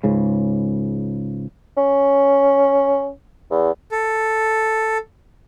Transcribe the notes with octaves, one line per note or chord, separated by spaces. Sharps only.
C#2 G#2 C#3
C#4
E2
A4